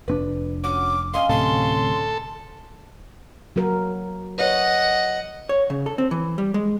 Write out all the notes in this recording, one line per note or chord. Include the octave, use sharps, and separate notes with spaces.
F1 C4 D4 B4
C#4 F#4 D6
C#4 D#5 F5 C6
D1 A2 C3 A4 C6
F#3 F#4 A#4
B4 C#5 D#5 F#5
C#5
C#3
A4
C4
E3
G3
G#3